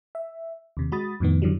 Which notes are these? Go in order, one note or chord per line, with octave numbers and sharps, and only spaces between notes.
E5
D#2 C3
G#3 F#4 B5 D#6 A6
F2 A2 D#3 B3
F#2 D3 E3 F#3 G3